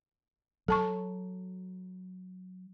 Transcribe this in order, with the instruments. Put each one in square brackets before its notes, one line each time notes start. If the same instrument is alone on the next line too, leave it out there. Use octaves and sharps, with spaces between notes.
[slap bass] F#3 [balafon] A4 A5 C#6